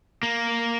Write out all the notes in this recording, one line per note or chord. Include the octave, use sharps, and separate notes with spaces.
A#3